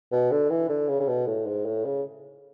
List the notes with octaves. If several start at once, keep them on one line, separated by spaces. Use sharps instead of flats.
B2
D3
E3
D3
C#3
C#3
B2
A2
G#2
A2
C#3